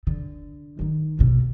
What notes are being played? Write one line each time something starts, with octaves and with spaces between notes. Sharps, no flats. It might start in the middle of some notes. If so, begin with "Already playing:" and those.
D3
D#3 D#4
A#1 B2